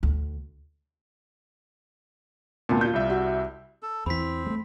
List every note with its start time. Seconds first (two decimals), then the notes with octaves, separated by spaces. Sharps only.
0.03 D2
2.69 D2 A#2 B3 A5
2.81 F4 G6
2.93 C2 G3 E5
3.10 F#4
3.83 A4
4.06 E2 E3 C4 B5 B6
4.46 G#3 A3